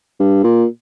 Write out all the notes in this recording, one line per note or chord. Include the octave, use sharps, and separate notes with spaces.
G2
A#2